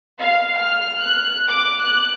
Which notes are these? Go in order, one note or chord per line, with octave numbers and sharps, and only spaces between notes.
F5
F6
F#6
D6
F#6